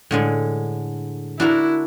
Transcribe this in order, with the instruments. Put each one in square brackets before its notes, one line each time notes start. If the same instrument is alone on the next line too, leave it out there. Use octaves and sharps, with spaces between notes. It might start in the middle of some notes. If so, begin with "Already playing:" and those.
[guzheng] A2 D3 G#3
[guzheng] D4 F#4 A#4 [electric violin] E4